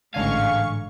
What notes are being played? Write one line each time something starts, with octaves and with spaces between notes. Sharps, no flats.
A1 G#2 D3 F5 G#5 C#6